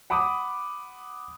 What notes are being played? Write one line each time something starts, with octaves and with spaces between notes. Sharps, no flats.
F#5 B5 D6 D#6